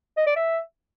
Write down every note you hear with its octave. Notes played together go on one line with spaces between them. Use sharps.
D#5
D5
E5